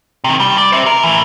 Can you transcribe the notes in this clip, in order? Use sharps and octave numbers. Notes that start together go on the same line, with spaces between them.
C3 D#3
G3
D5
C5 E5
A#4
A2 E3